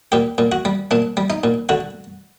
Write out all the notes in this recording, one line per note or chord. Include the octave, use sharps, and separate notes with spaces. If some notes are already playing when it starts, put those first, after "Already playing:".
A#2 G4
A#2
F#4
G3
A#2 D4
G3
D#4
A#2
D3 F#4